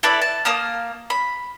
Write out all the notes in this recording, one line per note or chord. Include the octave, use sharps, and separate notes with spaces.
E4 A4 B4 D5
A5
A#3 A5 D#6 F6
B5